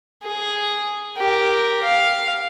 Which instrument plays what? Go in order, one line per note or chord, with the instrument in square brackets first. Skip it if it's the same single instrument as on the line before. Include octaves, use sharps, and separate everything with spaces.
[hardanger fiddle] G#4
G4 A#4
F5